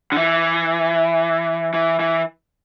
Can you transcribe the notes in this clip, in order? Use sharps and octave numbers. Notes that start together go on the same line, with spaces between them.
D3
E3
E3
E3